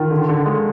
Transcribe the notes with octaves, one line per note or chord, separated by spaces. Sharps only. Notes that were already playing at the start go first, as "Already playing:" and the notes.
Already playing: D#3 F4
D3
D3
G#3